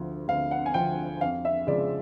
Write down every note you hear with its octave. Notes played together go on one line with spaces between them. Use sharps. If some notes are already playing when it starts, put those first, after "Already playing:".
Already playing: D2 D3 F3
D2 F5
F#5
G#5
D3 F3 G5
F2 F5
E5
C#3 F3 G#3 D5